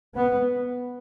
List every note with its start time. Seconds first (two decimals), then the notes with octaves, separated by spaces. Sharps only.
0.15 B3